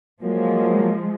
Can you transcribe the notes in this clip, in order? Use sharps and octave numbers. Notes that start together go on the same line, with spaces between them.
F3 F#3 G#3 A#3